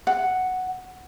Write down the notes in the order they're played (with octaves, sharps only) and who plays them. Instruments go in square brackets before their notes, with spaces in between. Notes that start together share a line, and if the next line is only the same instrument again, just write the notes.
[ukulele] F#5